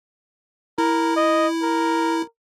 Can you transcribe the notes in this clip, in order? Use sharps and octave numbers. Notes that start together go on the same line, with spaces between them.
E4 A#4
D#5
A#4